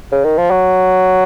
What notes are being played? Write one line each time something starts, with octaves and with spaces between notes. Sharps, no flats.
C#3
D#3
F3
F#3